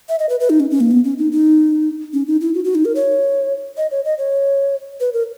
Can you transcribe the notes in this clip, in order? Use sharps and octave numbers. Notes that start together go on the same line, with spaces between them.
E5
D#5
B4
B4
D#4
C#4
C#4
A#3
B3
C#4
D#4
D#4
C#4
D#4
E4
F#4
F#4
D#4
A#4
C#5
D#5
C#5
D#5
C#5
B4
A#4